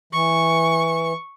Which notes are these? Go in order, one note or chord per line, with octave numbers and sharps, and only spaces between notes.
E3 C#6